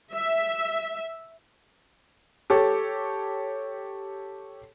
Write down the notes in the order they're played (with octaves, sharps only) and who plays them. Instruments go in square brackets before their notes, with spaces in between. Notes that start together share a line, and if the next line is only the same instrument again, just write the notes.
[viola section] E5
[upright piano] G4 A4 C#5